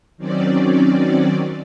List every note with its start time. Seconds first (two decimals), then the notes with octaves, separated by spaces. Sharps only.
0.17 D#3 F#3 C4 C#4 D5